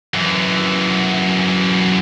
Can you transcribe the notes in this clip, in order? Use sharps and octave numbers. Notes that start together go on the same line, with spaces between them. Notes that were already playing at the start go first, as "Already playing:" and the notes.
F#2 E3